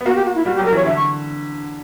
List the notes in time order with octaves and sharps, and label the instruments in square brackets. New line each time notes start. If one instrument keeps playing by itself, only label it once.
[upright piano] B3
[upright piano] A#3 [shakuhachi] F#4
[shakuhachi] G4
F#4
E4
[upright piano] G3 [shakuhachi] F#4
[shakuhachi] G4
[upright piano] F#3
[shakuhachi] A#4
[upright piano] E3 [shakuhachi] C#5
[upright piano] D3 [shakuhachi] E5
[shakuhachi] C#6